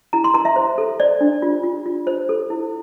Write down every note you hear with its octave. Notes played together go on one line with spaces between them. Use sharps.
E4 A#5
C6
A#4 A#5
E5
C5
A4
C5 D5
D4
F4
F4
F4
C5
A4
E4